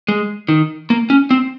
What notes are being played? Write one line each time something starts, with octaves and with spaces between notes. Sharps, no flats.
G#3
D#3
A#3
C#4
C4